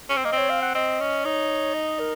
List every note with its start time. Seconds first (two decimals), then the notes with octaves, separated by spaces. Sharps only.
0.09 C#4
0.17 C4
0.25 A#3 D#5
0.32 C4
0.38 C#5
0.50 F5
0.62 F#5
0.75 C4 D#5
1.00 C#4
1.24 D#4 C#5
1.74 D#5
1.99 A#4